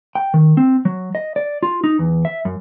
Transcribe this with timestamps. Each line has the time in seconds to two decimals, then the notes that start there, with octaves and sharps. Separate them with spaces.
0.15 G5
0.34 D#3
0.57 C4
0.85 F#3
1.15 D#5
1.36 D5
1.63 F4
1.84 D#4
1.99 E2
2.25 E5
2.45 F#2